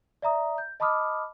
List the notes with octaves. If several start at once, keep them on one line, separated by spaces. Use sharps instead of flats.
D5 E5 A#5 D#6
G6
D#5 A5 B5 D6 D#6 F6